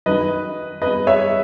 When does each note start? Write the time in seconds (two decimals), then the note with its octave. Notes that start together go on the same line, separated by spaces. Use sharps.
0.06 F#2 D#3 F#3 B4 D#5
0.82 B4 D#5
1.07 C#5 E5